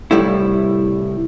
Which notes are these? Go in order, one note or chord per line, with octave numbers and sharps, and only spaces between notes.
C2 A2 G3 A3 E4